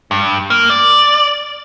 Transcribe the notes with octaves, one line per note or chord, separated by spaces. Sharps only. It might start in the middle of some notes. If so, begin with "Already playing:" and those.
G2
A#3
D5